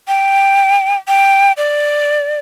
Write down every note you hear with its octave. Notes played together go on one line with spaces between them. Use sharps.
G5
G5
D5